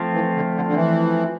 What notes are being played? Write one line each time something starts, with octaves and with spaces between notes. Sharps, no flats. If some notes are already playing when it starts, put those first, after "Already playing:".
Already playing: F3 A3 C4 F4
E3
D3
D3
D3
E3